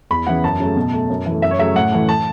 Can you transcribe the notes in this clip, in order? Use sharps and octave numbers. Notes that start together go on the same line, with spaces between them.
E2 B5
C#3 E3 B3 F#5
F#2 A5
C#3 F#3 A3
B2
A3
F#2
E3 A3
F#2 E5
C#5
C#3 F#3 A3 E5
A2 F#5
E3 A3
A5